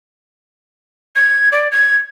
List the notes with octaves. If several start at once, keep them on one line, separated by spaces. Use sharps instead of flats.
G#6
D5
G#6